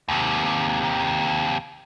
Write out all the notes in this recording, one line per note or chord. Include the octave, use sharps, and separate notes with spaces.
D#2 C3